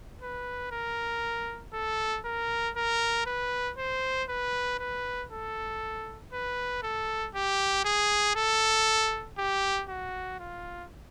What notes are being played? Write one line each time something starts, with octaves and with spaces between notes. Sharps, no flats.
B4
A#4
A4
A#4
A#4
B4
C5
B4
B4
A4
B4
A4
G4
G#4
A4
G4
F#4
F4